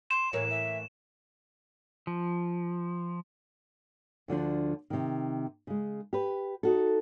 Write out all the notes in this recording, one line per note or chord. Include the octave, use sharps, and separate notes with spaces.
C6 E7
A2 E3 A#3 C#5
E5
F3
D2 D3 F3 D4
C3 D#3
C#3 G#3
G4 B4
D#4 F#4 A4